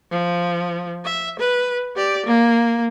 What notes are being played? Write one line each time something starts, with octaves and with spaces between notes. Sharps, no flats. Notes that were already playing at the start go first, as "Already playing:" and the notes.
F3
E5
B4
G4 D5
A#3